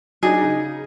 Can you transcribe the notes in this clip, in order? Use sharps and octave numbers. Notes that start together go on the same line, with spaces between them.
F#3 D4 D#4 G#4
C#3 D#4